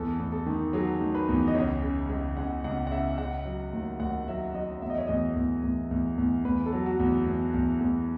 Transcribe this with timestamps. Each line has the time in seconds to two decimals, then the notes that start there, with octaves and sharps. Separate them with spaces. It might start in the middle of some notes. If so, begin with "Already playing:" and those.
Already playing: E2 A4
0.20 E2
0.32 A4
0.46 D#3
0.73 F#3 G#4
1.01 D#3
1.15 B4
1.29 E2
1.48 D#5
1.55 C#2 C#5
1.82 C#3
2.09 C#2
2.37 C#2 F#5
2.64 C#2 F#5
2.87 F#5
2.91 C#3 E5
3.18 C#3 F#5
3.45 F#3
3.73 D#2
4.00 D#2 F#5
4.28 F#3 E5
4.54 F#3 D#5
4.82 E2 E5
4.90 D#5
4.98 C#5
5.07 E2 D#5
5.36 E2
5.63 E2
5.91 E2
6.18 E2
6.44 E2 B4
6.66 A4
6.72 F#3
6.86 F#4
7.00 E2
7.26 E2
7.54 E2
7.81 E2